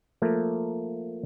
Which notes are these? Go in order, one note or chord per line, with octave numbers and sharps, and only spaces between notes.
F3 A3 A#3